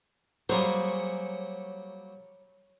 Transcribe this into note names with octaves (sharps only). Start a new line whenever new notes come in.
F#3 G3 A#3 G#4 C5 C#5